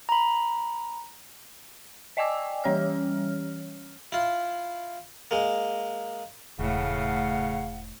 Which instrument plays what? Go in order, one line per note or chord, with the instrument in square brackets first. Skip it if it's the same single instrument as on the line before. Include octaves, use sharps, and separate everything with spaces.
[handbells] A#5 B5
[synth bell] D5 D#5 G5 G#5 D6 E6
E3 G3 C#4 C#5 F6
[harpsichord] E4 F4
G#3 A#3
[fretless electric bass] E1 [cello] A2 A3 [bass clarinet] C#3 [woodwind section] F5 F#5